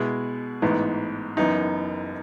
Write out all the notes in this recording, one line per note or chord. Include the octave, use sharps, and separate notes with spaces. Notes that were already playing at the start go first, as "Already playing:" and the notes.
Already playing: B2 G#3 B3 E4 G#4
A1 G#2 E3 B3 D#4
F#1 F#2 E3 B3 D#4